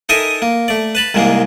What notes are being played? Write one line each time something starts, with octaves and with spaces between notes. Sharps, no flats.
D#4 A4 A#4 D#5 E5 G#5
A#3
A3 D5
B4 A5 B5
C2 G#2 C3 G#3 A#3